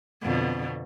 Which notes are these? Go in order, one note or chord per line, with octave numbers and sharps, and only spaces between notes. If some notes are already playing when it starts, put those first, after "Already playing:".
F2 B2 D3